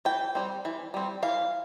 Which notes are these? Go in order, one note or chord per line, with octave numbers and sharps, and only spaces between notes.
E3 G5
G3 C4
E3
G3 C4
E3 F5